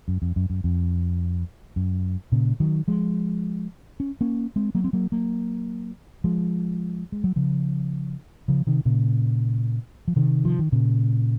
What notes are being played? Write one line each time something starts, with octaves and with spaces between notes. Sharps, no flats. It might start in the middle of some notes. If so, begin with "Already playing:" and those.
F#2
F2
F#2
F#2
F2
F#2
A#2 C#3
D#3 F#3
F3 G#3
C#4
A#3 C#4
G#3 C4
F#3 A#3
C4
F#3 A#3
F#3 A#3
F3 G#3
G#3
F#3
C#3 F3
C#3 F3
C3 D#3
A#2 C#3
F3
C3 D#3
F3
D#3
A#2 C#3